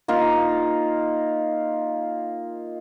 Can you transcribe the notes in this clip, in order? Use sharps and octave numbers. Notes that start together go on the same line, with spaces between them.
A#3 D#4 F4